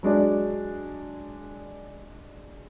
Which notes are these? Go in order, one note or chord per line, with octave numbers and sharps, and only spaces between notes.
F#3 G#3 D4 D5